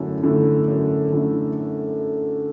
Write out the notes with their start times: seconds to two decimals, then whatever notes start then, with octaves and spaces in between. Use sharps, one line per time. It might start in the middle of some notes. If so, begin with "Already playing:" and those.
Already playing: F#2 D3 A3 E4
0.23 D3 A3 E4
0.68 F#2
1.12 D3 A3 E4